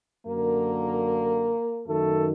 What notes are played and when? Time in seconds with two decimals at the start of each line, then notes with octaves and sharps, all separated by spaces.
0.25 F#2 D3 A#3 A#4
1.86 F#2 D#3 A3 A4